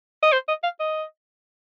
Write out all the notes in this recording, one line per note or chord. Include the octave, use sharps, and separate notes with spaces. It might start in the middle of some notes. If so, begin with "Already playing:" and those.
D#5
C5
D#5
F5
D#5